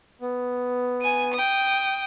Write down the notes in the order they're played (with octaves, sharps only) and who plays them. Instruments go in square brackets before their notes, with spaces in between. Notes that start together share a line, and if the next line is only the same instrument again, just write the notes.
[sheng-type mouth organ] B3
[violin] G#5 D#7
G5 D#6